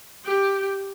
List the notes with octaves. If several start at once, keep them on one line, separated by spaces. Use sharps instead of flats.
G4